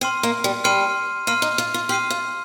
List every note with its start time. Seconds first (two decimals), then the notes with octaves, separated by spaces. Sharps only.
0.01 C4 C6 F6 C7 D#7
0.23 A#3
0.44 G3
0.64 G3 C6 F6 C7 D#7
1.27 A#3 C6 F6 C7 D#7
1.42 D#4
1.58 F4
1.74 F4
1.89 G4 C6 F6 C7 D#7
2.10 F4